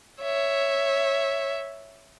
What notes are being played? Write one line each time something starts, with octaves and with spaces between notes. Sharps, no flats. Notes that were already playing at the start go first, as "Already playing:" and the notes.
C#5 E5